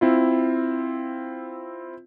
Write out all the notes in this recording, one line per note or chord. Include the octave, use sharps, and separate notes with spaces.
C4 E4 F4